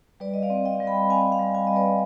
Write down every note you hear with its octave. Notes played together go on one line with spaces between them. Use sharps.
G3 B4 D5
D#5
D5 F5
C4
D#5 G5
G3
G5 B5
C4 F5 G#5
F5 G#5
G3
F5 G#5
G3 D#5
B4 D5